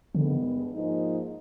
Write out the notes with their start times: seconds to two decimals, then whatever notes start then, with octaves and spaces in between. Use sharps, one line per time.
0.15 G2 D3 D#3 G#3 B3
0.72 G#2 F3 A#3 D#4 G#4